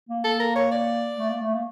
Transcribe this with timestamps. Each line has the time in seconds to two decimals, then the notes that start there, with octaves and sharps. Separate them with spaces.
0.09 A#3
0.24 A#3 A4
0.40 A#4
0.56 C#5
0.72 D5
1.18 A3
1.29 A#3
1.42 A3
1.54 A#3